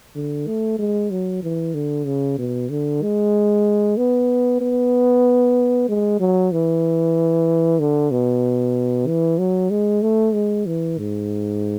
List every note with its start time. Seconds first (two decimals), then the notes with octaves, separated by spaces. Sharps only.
0.15 D3
0.47 A3
0.79 G#3
1.10 F#3
1.43 E3
1.74 D3
2.06 C#3
2.38 B2
2.70 D3
3.02 G#3
3.97 B3
4.61 B3
5.88 G#3
6.20 F#3
6.52 E3
7.79 D3
8.11 B2
9.07 E3
9.38 F#3
9.70 G#3
10.02 A3
10.34 G#3
10.66 E3
10.98 G#2